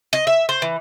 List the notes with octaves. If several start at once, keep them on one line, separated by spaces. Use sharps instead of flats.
D#5
E5
C5
E3